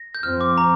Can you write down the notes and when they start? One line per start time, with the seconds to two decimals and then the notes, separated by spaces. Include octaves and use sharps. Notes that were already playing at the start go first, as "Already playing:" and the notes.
Already playing: A#6
0.15 G6
0.23 F2 F3 C4 F6
0.41 D6
0.58 A#5